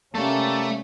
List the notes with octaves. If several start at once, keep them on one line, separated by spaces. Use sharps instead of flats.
C3 G3 A3 A#3 C#4 A5